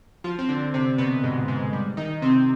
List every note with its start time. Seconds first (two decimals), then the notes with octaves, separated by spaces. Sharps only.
0.24 F3 F4
0.39 C4
0.49 D3 D4
0.74 C3 C4
0.98 B2 B3
1.23 G#2 G#3
1.48 G#2 G#3
1.73 G3
1.97 D#3 D#4
2.22 C3 C4